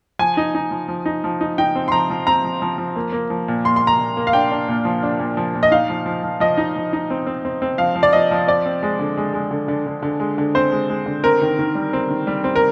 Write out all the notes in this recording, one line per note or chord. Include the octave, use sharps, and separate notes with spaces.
F3 G#5
D#4
D#4
F3
F3
D#4
F3
D#4
D#4 G5
C4
C6
F3 A#5
F3
C4 A#5
F3
F3
F3
A#3
A#3
F3
A#2
A#2 C6
C6
A#2
A#5
A#2
A#3
F5
D4 G5
D4
A#2
F3
D4
A#2
F3
A#2
D#5
D#4 F5
F3
F3
F3
F3 D#5
D#4
F3
D#4
C4
C4
C4
C4
F3 F5
F3
D5
F3 D#5
F3
C4 D5
C4
G#3
D3
G#3
G#3
D3
D3
D3
D3
G#3
D3
C4 C5
G#3
G#3
D3
C4 A#4
D#3
D#3
G3
C4
D#3
G3
C4
A#4